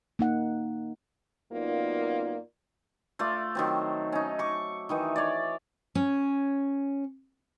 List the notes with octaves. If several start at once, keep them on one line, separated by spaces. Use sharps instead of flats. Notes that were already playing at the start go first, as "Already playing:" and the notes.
A#3 D#4 F#5
F#2 A#3 B3 D#4 F4 D5
A3 F4 D5
D#3 F#3 C4
C#4 D#4
C#6 D6
D#3 E3 D#4
C#5 D5
C#4 C#5